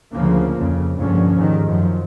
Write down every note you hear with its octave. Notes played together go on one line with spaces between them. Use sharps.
D2 C#3 F3 A#3
F2 C#3
C#2 G2 A#2 D3 F3 C#4
D#2 G#2 D#3
F#2 F3